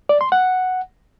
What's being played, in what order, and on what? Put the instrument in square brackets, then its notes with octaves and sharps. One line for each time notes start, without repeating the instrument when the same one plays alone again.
[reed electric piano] D5
C6
F#5